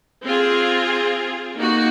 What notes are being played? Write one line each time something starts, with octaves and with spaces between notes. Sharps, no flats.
C4 F4 G#4
A#3 D#4 F#4